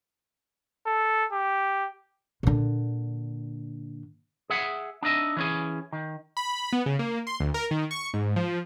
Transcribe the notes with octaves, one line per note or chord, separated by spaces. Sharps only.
A4
G4
A#2 D3
G#4 E5 F#5
D4 D#4 D#5 E5
E3 C#4 G#4
D#3
B5
B3
C#3
A#3
C6
D2
A#4
D#3
C#6
G#2
F3